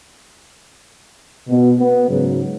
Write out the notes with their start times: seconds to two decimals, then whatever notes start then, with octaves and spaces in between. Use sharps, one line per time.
1.49 B2
1.79 B3
2.09 G#2 C#3 F#3